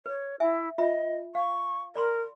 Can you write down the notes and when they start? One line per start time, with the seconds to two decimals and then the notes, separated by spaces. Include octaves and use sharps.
0.06 B4 C#5
0.40 E4 E5 G#5
0.78 F4 D#5 E5 B5
1.35 F5 C#6
1.96 A#4 D5 B5 C6